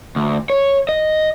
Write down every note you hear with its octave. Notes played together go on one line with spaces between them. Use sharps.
D2
C#5
D#5